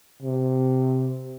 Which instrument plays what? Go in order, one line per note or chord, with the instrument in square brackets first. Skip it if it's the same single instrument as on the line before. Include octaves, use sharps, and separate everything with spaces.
[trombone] C3